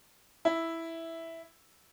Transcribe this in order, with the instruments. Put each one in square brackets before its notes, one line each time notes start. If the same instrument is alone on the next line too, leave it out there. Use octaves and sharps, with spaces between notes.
[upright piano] E4